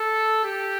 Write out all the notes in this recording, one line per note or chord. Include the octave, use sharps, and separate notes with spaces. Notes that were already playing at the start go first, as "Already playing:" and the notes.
Already playing: A4
G4